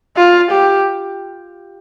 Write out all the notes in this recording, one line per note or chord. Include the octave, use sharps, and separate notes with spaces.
F4
G4